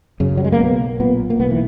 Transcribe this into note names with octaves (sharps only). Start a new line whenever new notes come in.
F#2 C#3
F#3
G#3
A#3
B1 B3
A#2 B3
A#3
B1 B3
E3